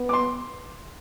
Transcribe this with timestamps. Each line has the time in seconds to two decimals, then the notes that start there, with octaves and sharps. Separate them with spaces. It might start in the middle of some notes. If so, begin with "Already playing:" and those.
Already playing: B3
0.09 D6
0.13 C6